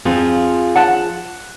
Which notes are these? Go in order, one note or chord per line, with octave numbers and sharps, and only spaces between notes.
F2 F3 F4 G#4
F#5 A5